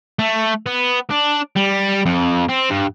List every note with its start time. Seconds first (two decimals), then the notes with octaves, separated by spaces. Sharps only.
0.19 A3
0.66 B3
1.11 D4
1.56 G3
2.06 F2
2.49 C4
2.70 G2